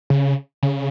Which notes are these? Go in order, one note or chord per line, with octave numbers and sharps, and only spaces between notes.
C#3
C#3